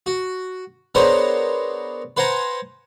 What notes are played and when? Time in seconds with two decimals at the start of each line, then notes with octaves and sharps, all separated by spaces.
0.06 F#4
0.95 B3 D4 G#4 A#4 C5 C#5
2.17 B4 C5 F#5 G#5 A#5